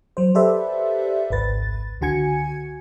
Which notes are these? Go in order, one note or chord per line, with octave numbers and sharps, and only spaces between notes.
F#3 C5
G4 A4 B4 C5 D5 E5
G#1 C#2 B4 A6
C#2 D3 F#4 G#5 G#6 C#7